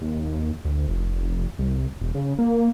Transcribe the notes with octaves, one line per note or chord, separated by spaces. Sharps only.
D#2
D2
F1
C2
E1
C#3
A#3